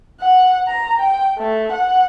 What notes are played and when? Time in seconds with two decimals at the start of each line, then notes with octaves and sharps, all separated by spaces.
0.21 F#5
0.68 A#5
1.01 G5
1.38 A3
1.72 F#5